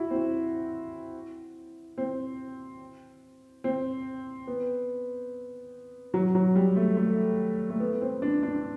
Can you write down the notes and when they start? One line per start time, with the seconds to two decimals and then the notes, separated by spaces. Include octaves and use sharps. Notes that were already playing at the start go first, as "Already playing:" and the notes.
Already playing: E4 F#4
0.10 C4
1.98 C4
3.64 C4
4.47 B3
6.14 F#3
6.35 F#3
6.55 G3
6.76 A3
6.97 A3
7.70 A3
7.80 B3
8.01 C4
8.22 D4
8.43 D4